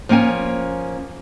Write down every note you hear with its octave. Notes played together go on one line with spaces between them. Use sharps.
F3 A#3 C#4 F#5 G#5